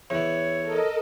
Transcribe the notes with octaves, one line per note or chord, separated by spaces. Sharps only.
E2 E3 C#5
A4 A#4 D#5